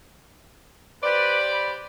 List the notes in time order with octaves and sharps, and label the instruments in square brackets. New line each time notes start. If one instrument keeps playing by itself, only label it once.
[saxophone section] G4 C5 D5 [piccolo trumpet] B4
[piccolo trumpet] B5